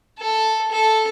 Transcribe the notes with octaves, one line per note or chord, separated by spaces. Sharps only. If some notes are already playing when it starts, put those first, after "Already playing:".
A4
A4